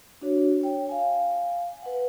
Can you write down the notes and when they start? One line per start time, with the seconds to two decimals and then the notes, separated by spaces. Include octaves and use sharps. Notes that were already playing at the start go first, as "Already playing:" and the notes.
0.21 D4 F#4 C#5
0.61 C#5 G5
0.89 F5 G#5
1.83 B4 F#5